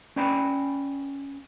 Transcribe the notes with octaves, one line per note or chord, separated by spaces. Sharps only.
C#4 B4 D5 G5 G#5 B5